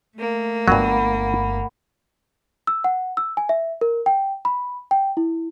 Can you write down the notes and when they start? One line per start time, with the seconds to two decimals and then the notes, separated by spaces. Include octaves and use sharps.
0.17 A3 A#3
0.68 G1 G2 F#3 F#5 B5
2.67 E6
2.84 F#5
3.17 E6
3.37 G#5
3.49 E5
3.81 A#4
4.06 G5
4.45 B5
4.91 G5
5.17 E4